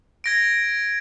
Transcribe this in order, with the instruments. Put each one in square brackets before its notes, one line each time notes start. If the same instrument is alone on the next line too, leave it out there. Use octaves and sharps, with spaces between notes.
[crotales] G#6 A#6 D7